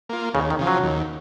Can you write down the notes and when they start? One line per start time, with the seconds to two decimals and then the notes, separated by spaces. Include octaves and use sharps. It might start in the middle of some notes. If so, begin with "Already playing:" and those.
0.09 A#3 F4
0.34 D#2 C#3
0.50 D#3
0.59 C#3 F3
0.67 F#3
0.83 D#2